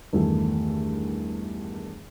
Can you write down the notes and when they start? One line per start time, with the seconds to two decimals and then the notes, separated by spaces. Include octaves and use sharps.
0.13 E2 G2 D#3 A3